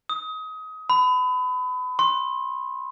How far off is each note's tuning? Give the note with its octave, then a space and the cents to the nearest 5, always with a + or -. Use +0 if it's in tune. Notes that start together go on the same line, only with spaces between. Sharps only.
D#6 +25
B5 +30
C6 +35